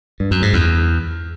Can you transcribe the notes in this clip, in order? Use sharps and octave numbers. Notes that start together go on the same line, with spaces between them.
G2
F#2
G#2
E2